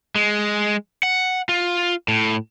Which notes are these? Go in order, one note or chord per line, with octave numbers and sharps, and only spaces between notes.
G#3
F#5
F4
A2